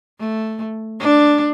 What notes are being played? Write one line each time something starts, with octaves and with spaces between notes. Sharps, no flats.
A3
D4